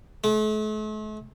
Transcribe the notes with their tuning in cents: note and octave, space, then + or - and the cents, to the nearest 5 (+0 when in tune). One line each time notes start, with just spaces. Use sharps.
A3 -45